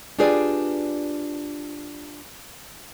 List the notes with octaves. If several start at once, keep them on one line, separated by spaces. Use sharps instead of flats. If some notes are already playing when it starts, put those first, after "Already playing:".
D4 F4 G4 G#4 B4 D5